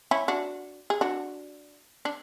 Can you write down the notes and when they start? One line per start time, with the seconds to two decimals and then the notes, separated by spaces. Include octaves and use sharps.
0.11 C#4 E4
0.28 D4 F#4
0.90 G#4
1.01 D4 F#4
2.05 D4